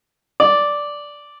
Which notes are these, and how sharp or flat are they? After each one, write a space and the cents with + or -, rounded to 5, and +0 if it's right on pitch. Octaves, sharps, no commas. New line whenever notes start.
D5 -5